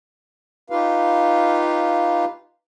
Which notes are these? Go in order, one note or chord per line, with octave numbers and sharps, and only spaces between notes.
D#4 F4 G4 B4 F5